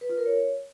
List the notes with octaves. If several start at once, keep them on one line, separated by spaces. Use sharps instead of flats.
B4
F4
A#4
C#5